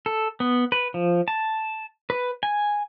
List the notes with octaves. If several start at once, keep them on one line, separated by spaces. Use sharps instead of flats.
A4
B3
B4
F3
A5
B4
G#5